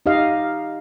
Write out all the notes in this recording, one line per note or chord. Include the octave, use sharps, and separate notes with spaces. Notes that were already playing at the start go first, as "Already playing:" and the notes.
D#4 G4 D#5 F5